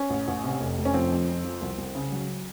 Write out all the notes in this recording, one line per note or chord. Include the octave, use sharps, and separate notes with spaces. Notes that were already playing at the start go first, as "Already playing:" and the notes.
Already playing: C#4
A1
A1
C3
F1
F1
C#4
F3 C4
F2
F2
F3
C2
C2
C#3
F#3